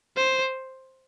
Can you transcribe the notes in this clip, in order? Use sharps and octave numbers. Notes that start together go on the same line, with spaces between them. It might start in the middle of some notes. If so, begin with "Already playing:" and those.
C5